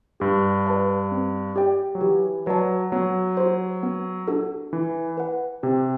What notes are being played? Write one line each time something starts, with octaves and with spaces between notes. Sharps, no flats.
G2 G4
B4 D5 A5
C4
G4 D5 G5
F#3
E3 G4
F#3 B4 D5 A5
F#3 B3
F#4 C5
B3
D4 F#4 A4
E3 E4
B4 F#5
C3 G4